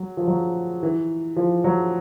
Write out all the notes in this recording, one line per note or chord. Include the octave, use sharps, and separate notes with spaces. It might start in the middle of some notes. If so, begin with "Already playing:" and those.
Already playing: F#3
F3
F#3
E3
F3
F#3